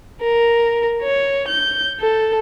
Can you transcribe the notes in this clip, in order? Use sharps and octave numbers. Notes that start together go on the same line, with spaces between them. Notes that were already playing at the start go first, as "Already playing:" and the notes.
A#4
C#5
G6
A4